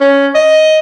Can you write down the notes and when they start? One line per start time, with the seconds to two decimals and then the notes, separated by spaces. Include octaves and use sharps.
0.01 C#4
0.35 D#5